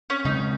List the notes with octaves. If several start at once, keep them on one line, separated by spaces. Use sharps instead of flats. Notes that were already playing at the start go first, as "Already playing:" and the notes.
C#4
C#3 G#3 C4 D#4